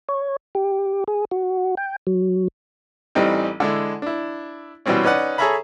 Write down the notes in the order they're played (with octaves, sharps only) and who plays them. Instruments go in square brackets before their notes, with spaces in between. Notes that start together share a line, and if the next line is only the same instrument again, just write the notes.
[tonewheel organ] C#5
G4
G#4
F#4
G5
F#3
[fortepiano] A1 E3 G3 C4 D#4 G4
D3 G#3 E4
D4 E4
B2 E3 G3 C4 C#4
C#4 D#4 B4 D5 F#5
G#4 A4 C#5 E5 A#5 B5